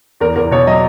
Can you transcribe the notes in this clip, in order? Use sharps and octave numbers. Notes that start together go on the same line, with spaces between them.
E2 A#4
E2 A#4
B2 C#5
F#3 D#5